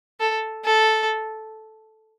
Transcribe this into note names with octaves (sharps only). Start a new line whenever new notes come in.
A4
A4